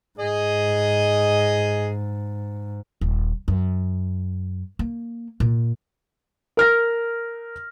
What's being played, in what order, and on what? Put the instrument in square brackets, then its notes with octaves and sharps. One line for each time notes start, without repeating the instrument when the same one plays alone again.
[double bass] G#2 [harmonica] G#4 D#5
[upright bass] D#1
F#2
A#3
A#2
[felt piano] A#4 F6 A#6